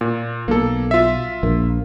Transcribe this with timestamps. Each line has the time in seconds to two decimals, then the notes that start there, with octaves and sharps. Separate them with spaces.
0.01 A#2
0.48 B1 A#3 A4
0.91 F4 E5
1.43 A#1 A#3